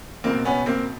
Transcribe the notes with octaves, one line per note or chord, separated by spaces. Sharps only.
C#2 B2 A#3 C4
B3 C#4
A#3 C4